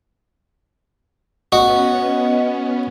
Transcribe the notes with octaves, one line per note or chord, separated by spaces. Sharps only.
B3 C#4 F#4 D#5